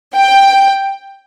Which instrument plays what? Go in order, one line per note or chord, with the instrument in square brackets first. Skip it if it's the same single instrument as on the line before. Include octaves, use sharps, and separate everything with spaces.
[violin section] G5